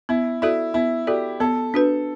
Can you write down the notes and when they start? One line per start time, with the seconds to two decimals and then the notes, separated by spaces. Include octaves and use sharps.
0.09 B3 E4
0.42 E4 F#4 A4 D5
0.74 B3 E4
1.07 F#4 G4 A4 D5
1.40 B3 A4
1.74 D4 F#4 B4